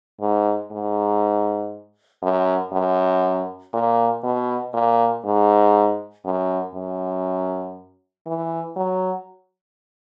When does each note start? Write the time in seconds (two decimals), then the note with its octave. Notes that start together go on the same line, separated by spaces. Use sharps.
0.21 G#2
0.71 G#2
2.22 F#2
2.72 F#2
3.73 A#2
4.23 B2
4.73 A#2
5.25 G#2
6.25 F#2
6.74 F#2
8.26 E3
8.76 F#3